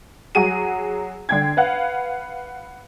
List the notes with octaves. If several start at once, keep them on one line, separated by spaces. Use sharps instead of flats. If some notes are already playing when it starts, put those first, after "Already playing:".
F#3 F#4 G#4 D#7
D3 G5 G#6
B4 F5 F#5